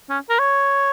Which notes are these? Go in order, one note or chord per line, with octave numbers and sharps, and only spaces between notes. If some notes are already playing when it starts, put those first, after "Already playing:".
C#4
A#4
C#5